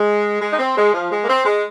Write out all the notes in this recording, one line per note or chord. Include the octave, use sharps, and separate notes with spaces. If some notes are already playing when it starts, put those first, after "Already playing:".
Already playing: G#3
G#3
D#4
C4
G#3
F3
G#3
A#3
C4
G#3